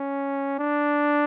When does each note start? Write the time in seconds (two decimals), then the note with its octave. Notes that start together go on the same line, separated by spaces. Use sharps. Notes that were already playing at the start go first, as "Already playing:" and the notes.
Already playing: C#4
0.59 D4